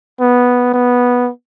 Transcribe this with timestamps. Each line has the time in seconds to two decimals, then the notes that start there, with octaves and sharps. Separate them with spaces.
0.20 B3
0.74 B3